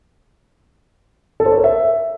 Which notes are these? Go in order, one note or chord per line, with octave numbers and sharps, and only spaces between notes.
A4
C5
C#5
A#4
E5